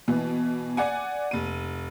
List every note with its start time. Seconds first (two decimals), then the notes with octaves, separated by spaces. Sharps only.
0.08 B2 E3
0.77 D5 F#5 G#5
1.31 F1 D#7